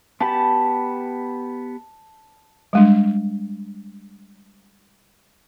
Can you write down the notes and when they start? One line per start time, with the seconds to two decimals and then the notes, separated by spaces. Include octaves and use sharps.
0.20 B3 G4 A5 B5
2.73 G3 G#3 D4